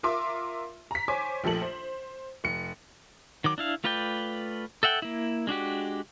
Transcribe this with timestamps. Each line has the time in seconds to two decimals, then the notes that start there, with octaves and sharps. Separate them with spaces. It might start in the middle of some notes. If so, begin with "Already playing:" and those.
0.03 F4 A#4 E5 C6 D6
0.91 A#5 B6
1.08 C5 C#5 G#5 D6
1.44 A#1 F3 A3 A4 F#7
1.62 C5
2.44 F1 C#7
3.44 D#3 F#3 D6
3.58 D4 E4 F5
3.84 A3 F4 B4 D5 G5
4.83 A4 E5 F#5 G5
5.02 A#3 E4
5.47 G#3 D4 F#4 G4